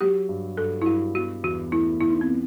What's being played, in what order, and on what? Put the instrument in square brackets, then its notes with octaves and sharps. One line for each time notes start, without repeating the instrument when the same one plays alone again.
[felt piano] F#3 [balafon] G4
[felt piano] G2
[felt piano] G2 [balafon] A4
[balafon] E4
[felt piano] G2 [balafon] F#4
[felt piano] B2 [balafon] F#4
[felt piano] E2 [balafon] F#4
[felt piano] A3 [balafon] E4
[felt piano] E2 [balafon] E4
[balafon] D#4
C4
[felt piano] B3